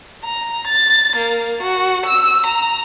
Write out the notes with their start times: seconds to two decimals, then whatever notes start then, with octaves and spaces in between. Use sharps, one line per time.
0.24 A#5
0.67 A6
1.16 A#3
1.62 F#4
2.06 E6
2.46 A#5